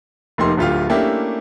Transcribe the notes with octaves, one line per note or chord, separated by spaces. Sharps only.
F1 A3 A#3 D#4 G4 C6
D1 D2 A3 F4 G4 F5
A3 A#3 C#4 D4 E4 G4